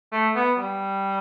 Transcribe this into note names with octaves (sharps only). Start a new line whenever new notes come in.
A3
B3
G3